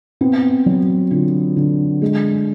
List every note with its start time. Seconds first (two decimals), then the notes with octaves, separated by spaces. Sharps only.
0.21 B3 C4
0.66 F#3
1.11 D3 F4
1.56 D3
2.02 G#3